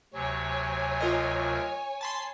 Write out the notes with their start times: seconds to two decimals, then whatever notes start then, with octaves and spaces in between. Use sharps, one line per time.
0.14 D2 C3 F#3 C#5 G#5
1.01 F4 A#4 D#5
2.01 A5 B5 C6